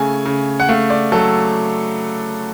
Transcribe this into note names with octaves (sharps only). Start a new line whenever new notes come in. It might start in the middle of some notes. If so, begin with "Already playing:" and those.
Already playing: C#3 A3 G#5
C#3
F#5
A3 F5
D5
F#3 A4